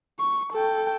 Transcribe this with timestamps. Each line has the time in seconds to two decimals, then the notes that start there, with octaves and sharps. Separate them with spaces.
0.19 C#6
0.53 A4 G5